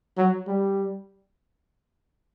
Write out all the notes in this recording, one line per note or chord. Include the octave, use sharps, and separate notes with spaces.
F#3
G3